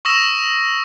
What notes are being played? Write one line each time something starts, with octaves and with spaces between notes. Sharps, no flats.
C#6 D#6 E6 A#6 E7